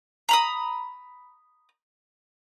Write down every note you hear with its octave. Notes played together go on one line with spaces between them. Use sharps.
A#5 B5 D#6